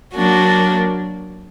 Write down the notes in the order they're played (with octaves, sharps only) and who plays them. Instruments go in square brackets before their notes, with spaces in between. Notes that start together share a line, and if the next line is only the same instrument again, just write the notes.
[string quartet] F#3 A#3 D4 F#4